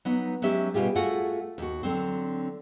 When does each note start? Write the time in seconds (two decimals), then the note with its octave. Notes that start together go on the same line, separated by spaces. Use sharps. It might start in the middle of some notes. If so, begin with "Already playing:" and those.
0.05 F#3 B3 D#4
0.42 F#3 G#3 C#4 G4 E5
0.74 B2 G3 F4 G4 G#4
0.95 A3 F4 F#4 G#4 F#5
1.58 D#2 F#4
1.83 D3 F#3 C4